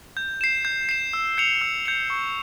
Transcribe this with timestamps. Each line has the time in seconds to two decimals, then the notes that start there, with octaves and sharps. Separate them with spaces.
0.17 G6
0.41 C7 E7
0.65 G6
0.89 C7 E7
1.13 E6
1.38 G6 C#7 F7
1.62 E6
1.86 G6 C#7 F7
2.10 C#6